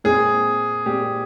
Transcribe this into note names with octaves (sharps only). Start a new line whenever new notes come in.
A#2 G#3 C4 G#4
A#2 G#3 C4 G4